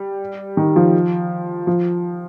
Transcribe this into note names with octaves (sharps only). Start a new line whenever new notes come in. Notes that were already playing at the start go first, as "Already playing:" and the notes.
Already playing: G3
D#3
F3
F3